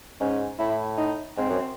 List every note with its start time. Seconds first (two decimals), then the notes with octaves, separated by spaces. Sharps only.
0.20 G#2 C#4
0.59 A2 E4
0.97 D#4
1.37 G#2 C4
1.49 F#2